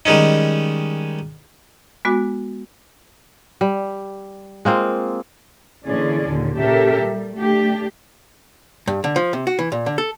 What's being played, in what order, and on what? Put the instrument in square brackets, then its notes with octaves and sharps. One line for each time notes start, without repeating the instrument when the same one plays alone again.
[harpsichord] D#3 G3 G#3 C#4 D#4
[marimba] G#3 B3 F#4 D6
[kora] G3
G#3 A#3 C4 F4
[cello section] A#2 D3 E3 C#4 G#4 D5
D#2 A#2 D3
A#2 C#3 G4 A4 A#4 E5
G3
A3 D4 G4
[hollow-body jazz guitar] G2
D3
F3
C3
F#4
E3
A#2
D3
A4